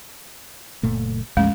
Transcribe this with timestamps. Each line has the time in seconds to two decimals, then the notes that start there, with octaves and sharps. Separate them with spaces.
0.83 F#1 A#2 A3
1.37 A#1 E2 G#3 A3 C#4